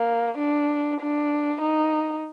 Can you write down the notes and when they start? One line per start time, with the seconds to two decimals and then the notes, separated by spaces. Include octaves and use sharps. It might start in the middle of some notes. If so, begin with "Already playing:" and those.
Already playing: A#3
0.38 D4
1.01 D4
1.61 D#4